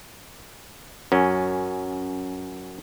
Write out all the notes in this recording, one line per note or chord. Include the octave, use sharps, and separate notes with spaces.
F#2 C#4